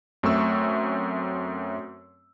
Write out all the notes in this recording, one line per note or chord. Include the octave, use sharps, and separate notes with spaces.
F#2 A3 C4 E5 C#6 E6